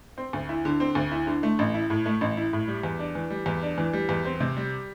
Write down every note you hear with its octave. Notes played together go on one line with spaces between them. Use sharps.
C4
D2
E4
D3
C4
D2
E4
D3
A3
A1
E4
A2
A3
A1
E4
A2
G3
E2
D4
E3
G3
E2
D4
E3
G3
E2
C4
C3
G3